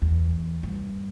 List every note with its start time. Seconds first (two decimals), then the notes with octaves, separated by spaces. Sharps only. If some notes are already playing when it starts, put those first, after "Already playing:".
0.02 E2
0.63 G2